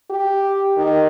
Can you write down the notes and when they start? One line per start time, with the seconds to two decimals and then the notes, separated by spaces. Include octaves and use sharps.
0.10 G4
0.77 D#3